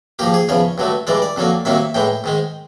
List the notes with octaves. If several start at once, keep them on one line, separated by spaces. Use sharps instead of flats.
G#2 F3 A#3 G4
G#4
E2 C#3 F3 C#5
G2 D3 F#3 A3
G2 E3 G#3 D5
D5
F2 D3 F#3 A#3
C2 C3 D#3 F#3 A#3 E5
A2 E3 G#3 G5
G#2 D#3 G#3